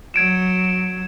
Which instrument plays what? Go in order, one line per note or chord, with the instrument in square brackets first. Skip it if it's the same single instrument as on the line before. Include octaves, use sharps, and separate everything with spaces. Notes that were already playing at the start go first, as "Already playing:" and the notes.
[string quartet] F#3 [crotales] G#6 D7 E7